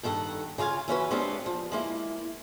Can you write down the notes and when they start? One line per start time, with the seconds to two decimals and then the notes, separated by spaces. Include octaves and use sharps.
0.03 G2 D#3 A4 F#5
0.58 C#3 F4 G4 F5 G#5
0.88 E3 C#4 F#4 B4
1.11 G#3 B3 C4 D4 G4 F5
1.46 F3
1.72 G#3 A#3 E4